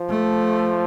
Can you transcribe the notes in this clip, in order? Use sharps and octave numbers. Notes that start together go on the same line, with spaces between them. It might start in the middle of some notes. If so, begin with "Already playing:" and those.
Already playing: F3
A3